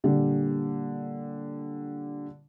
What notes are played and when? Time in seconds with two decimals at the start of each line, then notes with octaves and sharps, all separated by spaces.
0.04 A#2 D3 G3